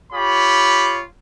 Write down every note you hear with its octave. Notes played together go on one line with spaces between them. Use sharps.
F4 G4 C#5 B5